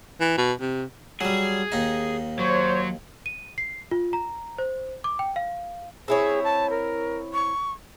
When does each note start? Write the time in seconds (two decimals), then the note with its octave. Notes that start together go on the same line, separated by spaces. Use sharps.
0.20 E3
0.38 B2
0.60 C3
1.21 F#3 G3 G#4
1.72 D#2 D#4
2.39 F#3 C5 C#5
3.26 D#7
3.58 C7
3.91 F4
4.13 A#5
4.58 C5
5.04 D6
5.19 G5
5.36 F5
6.08 C4 E4 G#4 C#5
6.44 A5
6.70 A#4
7.34 C#6